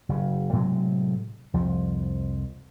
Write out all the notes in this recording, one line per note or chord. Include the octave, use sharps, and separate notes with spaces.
F#1 C#3
A2 C3 F#3 G#3
C2 F2 F3